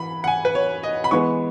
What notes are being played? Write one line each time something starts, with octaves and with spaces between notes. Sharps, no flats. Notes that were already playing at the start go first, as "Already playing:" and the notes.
Already playing: E3 B5
F#5
G#5
B4
C#5
D#5
B5
E3 G#3 B3 C#6